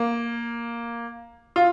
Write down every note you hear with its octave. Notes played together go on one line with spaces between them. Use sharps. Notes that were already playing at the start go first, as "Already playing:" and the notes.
Already playing: A#3
F4